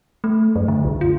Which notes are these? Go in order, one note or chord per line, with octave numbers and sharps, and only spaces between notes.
A3
F#2
D3
C2
F4